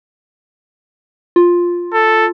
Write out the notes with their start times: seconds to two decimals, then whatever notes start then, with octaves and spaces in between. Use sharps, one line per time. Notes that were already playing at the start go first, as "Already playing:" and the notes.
1.36 F4
1.93 A4